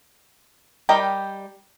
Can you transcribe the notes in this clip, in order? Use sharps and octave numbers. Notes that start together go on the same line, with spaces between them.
G3 G4 A#4 D#5 G5